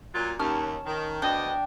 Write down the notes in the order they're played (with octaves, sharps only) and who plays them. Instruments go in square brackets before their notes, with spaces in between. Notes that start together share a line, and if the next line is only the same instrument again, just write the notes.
[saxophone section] A#2 F#3 F4
[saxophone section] D#2 [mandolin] C#4 A5 F6
[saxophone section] D#3
[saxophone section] D2 B3 D#5 [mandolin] D4 G5